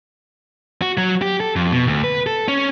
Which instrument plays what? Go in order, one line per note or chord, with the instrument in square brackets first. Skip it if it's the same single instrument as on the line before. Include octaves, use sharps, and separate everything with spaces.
[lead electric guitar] F#4
F#3
G4
A4
F2
B2
D2
B4
A4
C#4